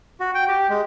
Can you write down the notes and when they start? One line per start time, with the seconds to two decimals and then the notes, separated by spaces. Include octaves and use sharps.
0.20 F#4
0.35 G5
0.48 G4
0.69 G#3